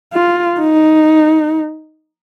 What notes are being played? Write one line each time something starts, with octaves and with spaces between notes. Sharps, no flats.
F4
D#4